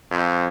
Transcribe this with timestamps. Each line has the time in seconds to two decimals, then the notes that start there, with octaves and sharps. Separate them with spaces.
0.11 F2